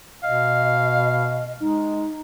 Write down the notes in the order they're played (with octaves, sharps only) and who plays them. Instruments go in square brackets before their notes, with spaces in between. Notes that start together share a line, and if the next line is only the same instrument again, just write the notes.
[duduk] B2 [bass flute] D#5 [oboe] F5
[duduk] G#3 [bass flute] D#4